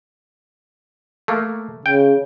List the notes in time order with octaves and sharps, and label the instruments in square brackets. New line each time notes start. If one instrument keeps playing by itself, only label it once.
[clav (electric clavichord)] A3 A#3
[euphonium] C#3 [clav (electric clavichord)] G5